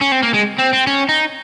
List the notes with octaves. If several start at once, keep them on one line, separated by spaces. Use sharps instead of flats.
C#4
C4
A#3
G#3
C4
C4
C#4
D#4